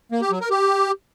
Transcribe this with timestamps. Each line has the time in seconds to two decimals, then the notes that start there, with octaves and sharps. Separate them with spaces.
0.12 A#3
0.21 G4
0.31 F#3
0.41 A#4
0.50 G4